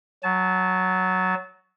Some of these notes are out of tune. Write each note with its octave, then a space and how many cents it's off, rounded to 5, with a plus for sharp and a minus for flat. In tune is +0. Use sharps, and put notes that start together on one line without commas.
F#3 +0 A5 -30